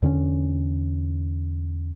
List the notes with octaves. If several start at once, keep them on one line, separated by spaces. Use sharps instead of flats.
E2 D3 C4 C#4